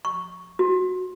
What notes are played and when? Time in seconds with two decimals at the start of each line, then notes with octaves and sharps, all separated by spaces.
0.05 C#6
0.59 F#4